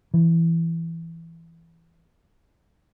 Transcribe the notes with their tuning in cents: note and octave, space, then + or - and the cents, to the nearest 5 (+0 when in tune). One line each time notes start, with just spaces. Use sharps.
E3 +10